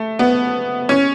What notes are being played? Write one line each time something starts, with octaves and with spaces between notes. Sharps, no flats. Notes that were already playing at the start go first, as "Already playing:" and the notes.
Already playing: A3
B3
C#4